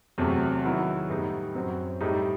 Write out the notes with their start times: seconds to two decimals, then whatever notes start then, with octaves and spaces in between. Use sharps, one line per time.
0.18 E2 C3 F#3 A3
0.64 D#3 F#3 B3 E4
1.09 A2 G3 B3 D#4
1.55 F#2 F#3 C4
2.01 A2 G3 D#4